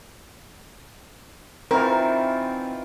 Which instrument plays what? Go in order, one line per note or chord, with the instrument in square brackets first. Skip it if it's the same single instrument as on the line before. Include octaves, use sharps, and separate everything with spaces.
[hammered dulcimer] D#3 E3 F4 [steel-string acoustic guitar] C4 [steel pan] A#4